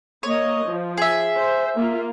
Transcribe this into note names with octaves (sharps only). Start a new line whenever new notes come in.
A#3 C#5 D#5
F3
G#4 E5
C5
A#3 F4